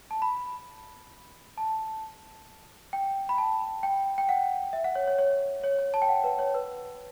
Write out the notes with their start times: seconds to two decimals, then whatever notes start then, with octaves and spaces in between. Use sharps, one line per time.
0.11 A5
0.22 B5
1.58 A5
2.93 G5
3.29 B5
3.38 A5
3.83 G5
4.18 G5
4.29 F#5
4.73 E5
4.84 F#5
4.95 C#5
5.08 C#5
5.19 C#5
5.64 C#5
5.79 C#5
5.94 A5
6.02 G5
6.09 F#5
6.24 B4
6.39 C#5
6.54 B4